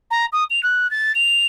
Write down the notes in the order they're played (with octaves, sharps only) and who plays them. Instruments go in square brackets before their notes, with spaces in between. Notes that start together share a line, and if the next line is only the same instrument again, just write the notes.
[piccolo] A#5
D#6
F7
F#6
A6
F7